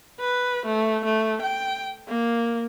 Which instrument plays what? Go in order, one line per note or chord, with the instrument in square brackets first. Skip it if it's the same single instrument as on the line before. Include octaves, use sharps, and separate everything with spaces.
[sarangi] B4
A3
A3
G5
A#3